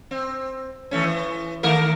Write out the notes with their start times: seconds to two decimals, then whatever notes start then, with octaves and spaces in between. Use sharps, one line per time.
0.11 C4
0.91 E3 A3 C#4
1.04 E3
1.63 D#3 A3 A#4